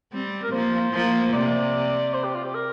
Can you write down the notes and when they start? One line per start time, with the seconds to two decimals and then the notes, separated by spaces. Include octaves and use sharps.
0.12 G3 C4
0.43 A#4
0.52 F3 A#3 C5
0.93 F3 A#3
1.33 C3 D5
2.14 C5
2.24 G4
2.35 F4
2.45 G4
2.55 A#4